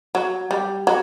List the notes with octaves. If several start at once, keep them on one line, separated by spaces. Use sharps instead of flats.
F#3
G3
F#3